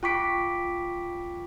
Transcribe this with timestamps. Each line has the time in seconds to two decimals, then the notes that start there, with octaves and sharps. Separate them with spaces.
0.03 F4 G5 C#6 D6 B6 D7